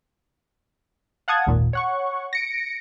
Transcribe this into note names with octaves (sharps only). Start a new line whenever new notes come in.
F5 F#5 A5 D#6 G#6
G#1 D#2 A#2
C#5 F#5 C#6
A#6 C#7 D7